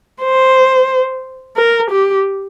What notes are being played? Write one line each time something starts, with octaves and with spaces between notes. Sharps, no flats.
C5
A#4
G4